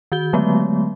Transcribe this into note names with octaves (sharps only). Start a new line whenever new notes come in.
D#3 F#4 G6 G7
D3 F#3 G#3 A3 B3